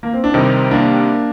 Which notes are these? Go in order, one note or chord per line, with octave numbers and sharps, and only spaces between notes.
A#3
C4
D4
C3 D#3 G3 C4 D#4
A#3 D4